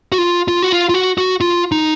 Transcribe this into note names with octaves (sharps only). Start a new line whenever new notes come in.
F#4
F4
F4
F#4
F4
F4
F#4
F#4
F4
D#4